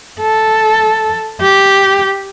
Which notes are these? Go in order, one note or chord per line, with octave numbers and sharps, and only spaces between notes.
A4
G4